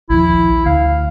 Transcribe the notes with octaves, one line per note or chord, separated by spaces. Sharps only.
A#1 D#2 F3 E4
D2 F5